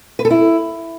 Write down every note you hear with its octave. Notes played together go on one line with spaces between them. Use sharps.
B4
A4
E4